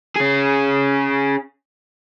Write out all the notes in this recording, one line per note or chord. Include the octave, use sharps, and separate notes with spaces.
C#4 G#4